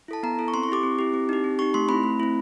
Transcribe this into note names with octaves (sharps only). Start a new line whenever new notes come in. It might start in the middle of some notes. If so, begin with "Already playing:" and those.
E4 A4 A5
B3 A#5
E4 A4
C#6
C4 C6
C#6
E4 G4 D6
C4
E4 G4
C4
D#4 G4
C4
D#4 G4 C#6
A3 C6
C4 E4 B5
A3
C4 E4